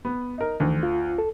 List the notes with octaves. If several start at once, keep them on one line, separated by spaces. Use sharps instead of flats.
B3
D#4 A#4
D2 D#3 E3
F4
A4